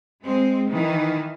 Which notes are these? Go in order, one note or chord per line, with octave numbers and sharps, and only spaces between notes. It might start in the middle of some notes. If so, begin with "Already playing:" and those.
G#3 C4
D#3 E3